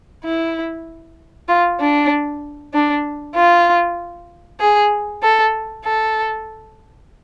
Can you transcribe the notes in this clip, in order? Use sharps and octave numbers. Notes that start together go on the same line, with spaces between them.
E4
F4
D4
D4
F4
G#4
A4
A4